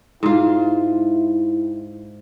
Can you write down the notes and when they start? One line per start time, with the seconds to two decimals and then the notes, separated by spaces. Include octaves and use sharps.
0.23 G#2 E4 F4